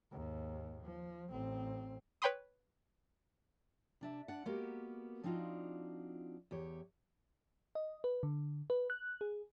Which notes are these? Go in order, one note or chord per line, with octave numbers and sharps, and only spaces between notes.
D#2 G#2
F3
A1 C4
B4 C#5 G5 B5 C6 D#6
C3 D4 E5
D4 F#5
G#3 A#3 B3 F#4 G4 A#4
F3 C4 D4 D#4 F4 F#4
E2 G4 C#5
D#5
B4
D3
B4
F#6
G#4